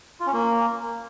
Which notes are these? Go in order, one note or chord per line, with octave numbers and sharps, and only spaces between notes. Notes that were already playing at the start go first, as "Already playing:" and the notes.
F4
C#4
A#3